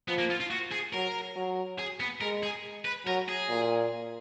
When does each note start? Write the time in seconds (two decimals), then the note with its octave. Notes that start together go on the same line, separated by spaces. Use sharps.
0.08 F3 B3
0.18 A#3
0.30 F4
0.40 F4
0.51 F#4
0.72 G#4
0.93 F#3 A#4
1.36 F#3
1.79 G#4
2.00 B3
2.21 G#3 A#4
2.43 G#4
2.85 B4
3.06 F#3 A#4
3.28 G#4
3.49 A#2